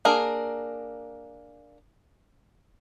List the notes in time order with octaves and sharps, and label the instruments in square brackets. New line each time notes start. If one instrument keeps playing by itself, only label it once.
[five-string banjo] A#3 D4 G#4 A#4